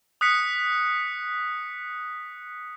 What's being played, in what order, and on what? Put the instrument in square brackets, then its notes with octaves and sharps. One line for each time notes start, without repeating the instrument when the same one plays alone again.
[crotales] D#6 F#6 B6 C#7